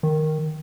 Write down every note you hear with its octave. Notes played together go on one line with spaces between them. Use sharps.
D#3